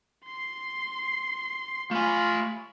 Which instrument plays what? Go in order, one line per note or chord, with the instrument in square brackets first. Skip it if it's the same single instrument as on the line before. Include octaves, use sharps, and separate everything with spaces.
[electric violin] C6 C7
[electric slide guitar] A3 G#5 [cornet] F4 [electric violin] C#5 B5